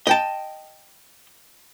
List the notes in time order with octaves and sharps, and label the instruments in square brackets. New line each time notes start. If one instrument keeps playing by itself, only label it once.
[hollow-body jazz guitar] D#5 G5 A5